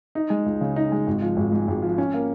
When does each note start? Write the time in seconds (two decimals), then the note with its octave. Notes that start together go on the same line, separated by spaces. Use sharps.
0.15 D#4
0.30 G#3
0.46 C#2
0.61 C#3
0.76 D#4
0.92 G#3
1.07 G#1
1.22 F3
1.37 G#1
1.52 G#2
1.68 G#1
1.82 F3
1.98 C#4
2.14 A#3